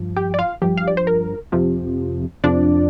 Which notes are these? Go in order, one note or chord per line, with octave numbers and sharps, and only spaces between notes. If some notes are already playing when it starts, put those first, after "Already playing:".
Already playing: G2 F3
G4 G5
D5
F4 F5
G2 F3 G4
F5
D5
C5
A#4
F2 C3 F3
F2 C3 F3 D4 D5